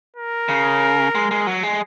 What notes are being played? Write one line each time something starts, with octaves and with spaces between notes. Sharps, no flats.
A#4
C#3
G#3
G#3
F#3
G#3